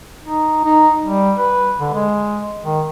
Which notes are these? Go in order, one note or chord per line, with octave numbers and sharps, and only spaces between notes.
D#4
D#4
G3
B4
D3
G#3
D#3